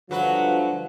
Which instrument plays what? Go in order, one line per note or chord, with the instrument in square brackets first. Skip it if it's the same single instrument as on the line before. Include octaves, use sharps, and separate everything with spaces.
[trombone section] G2 D3 F3 [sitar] F#3 B4 [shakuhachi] F#5